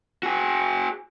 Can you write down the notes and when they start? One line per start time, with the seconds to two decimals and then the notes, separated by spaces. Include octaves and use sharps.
0.23 F#4 G#4